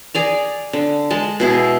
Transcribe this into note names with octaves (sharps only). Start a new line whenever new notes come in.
G#4 D5 A#5
D3
G#3 A5
B2 E4 G#4